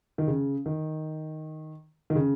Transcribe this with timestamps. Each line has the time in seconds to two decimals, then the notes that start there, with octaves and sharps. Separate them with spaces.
0.18 D#3
0.27 C#3
0.66 D#3
2.10 D#3
2.15 C#3